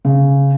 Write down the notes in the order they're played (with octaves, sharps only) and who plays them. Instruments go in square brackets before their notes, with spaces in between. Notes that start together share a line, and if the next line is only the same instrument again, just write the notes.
[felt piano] C#3